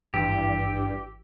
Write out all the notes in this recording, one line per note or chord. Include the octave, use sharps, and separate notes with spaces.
G#1 G2 E3 G4 E6